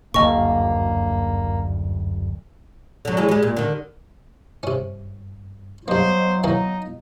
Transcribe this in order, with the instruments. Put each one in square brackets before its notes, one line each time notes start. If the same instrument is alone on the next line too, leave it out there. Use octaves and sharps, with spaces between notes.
[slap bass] F#1 D2 G2 [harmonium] A#3 [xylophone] D#5 C#6
[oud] D3 F#3
E3 F#3 G#3
G3 G#3
A#2
D3 D#3
[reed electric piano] G2 [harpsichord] C3 C#4
[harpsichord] G2 A#3 [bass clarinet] F#3 [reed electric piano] B3 D#5 F5 [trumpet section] C5
[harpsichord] E3 A#3 C#4 [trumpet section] D#4